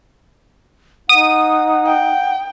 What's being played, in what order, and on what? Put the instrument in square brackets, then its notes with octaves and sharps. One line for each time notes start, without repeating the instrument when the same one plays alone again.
[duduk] D#4 [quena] F#5 [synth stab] D#6
[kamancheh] G5